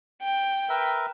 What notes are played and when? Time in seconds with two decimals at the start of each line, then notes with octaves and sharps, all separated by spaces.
0.23 G5
0.69 A#4 B4 E5